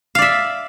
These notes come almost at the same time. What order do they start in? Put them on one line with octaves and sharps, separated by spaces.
F5 D5 E5